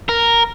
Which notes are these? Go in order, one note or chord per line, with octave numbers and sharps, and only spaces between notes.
A#4